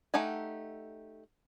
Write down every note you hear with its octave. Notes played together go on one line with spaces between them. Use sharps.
A3 D#4 G4 F#5 G#5